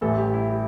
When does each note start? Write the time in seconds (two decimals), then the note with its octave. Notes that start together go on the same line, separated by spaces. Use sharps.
0.01 A1 A2 E3 G3 A4
0.18 G4
0.34 E4
0.50 G4